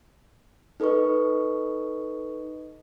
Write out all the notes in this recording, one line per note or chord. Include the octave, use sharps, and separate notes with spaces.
D#4 A4 B4 D#5 C#6